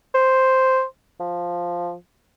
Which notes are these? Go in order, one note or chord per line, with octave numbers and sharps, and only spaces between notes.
C5
F3